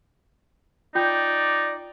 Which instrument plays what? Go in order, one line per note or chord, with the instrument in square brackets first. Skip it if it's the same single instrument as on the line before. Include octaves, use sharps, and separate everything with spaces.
[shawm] D#4 [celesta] F4 G5 G6 [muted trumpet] D5